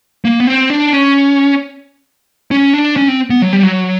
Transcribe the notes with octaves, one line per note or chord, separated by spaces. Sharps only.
A#3
B3
C4
D4
C#4
C#4
D4
C#4
C4
B3
F#3
G3
F#3